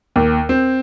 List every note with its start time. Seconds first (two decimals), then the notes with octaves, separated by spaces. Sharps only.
0.16 D#2
0.49 C4